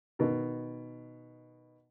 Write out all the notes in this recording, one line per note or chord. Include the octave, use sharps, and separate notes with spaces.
B2 D#3